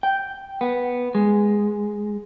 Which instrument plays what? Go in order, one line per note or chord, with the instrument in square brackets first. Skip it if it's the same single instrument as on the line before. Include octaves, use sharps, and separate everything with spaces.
[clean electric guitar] G5
B3
G#3